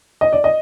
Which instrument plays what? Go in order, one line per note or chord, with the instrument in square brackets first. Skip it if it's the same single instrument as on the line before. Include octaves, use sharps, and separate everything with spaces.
[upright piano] D#5
D5
D#5